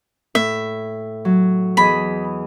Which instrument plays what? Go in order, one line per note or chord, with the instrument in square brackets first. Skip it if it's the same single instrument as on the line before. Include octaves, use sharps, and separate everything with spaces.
[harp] A2 [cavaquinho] E5
[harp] F#3
[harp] E2 G#4 D#5 [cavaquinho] B5